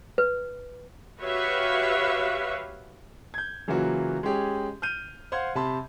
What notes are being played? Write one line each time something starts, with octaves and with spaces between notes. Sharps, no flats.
B4
F#4 G4 B4 C#5 E5 F5
G6 G#6
C#3 E3 F#3 A#3 F4 F#4
G#3 C#4 G4 G#4
F6 G6 D#7
C5 F5 F#5 C6 G#6
C3 A5 B5 C6